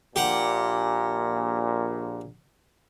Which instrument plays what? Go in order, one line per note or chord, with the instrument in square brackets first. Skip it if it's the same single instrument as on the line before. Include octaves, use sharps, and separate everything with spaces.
[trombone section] A#1 A#2 [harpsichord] G4 F#5